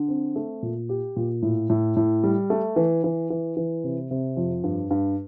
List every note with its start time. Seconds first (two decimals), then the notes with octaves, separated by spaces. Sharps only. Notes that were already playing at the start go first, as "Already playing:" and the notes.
Already playing: D3
0.08 C4
0.36 A3
0.63 A#2
0.89 G4
1.16 A#2
1.42 A2
1.70 A2
1.96 A2
2.24 G3
2.50 A3
2.76 E3
3.04 E3
3.30 E3
3.57 E3
3.84 C3
4.11 C3
4.37 F2
4.64 G2
4.90 G2